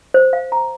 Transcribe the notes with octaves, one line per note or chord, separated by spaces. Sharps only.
C5
F5
A#5